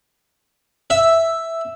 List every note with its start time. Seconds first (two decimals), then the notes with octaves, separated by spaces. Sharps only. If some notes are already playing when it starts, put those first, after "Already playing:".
0.90 E5